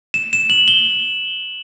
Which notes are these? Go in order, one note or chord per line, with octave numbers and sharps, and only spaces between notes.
E7
E7
F#7
G7